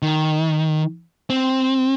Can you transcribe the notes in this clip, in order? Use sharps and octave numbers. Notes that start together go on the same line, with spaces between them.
D#3
C4